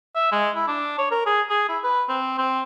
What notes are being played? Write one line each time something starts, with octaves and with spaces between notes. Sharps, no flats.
E5
G#3
E4
D4
C#5
A#4
G#4
G#4
E4
B4
C4
C4